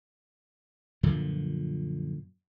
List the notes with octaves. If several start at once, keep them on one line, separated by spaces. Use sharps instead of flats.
F#2 A#2 D3 F3